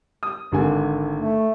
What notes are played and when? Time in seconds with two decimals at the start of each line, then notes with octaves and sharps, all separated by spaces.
0.23 D#6
0.52 G#1 D3 G#5
1.16 A3